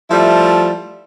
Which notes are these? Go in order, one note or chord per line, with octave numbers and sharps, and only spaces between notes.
F3 G3 A3 E4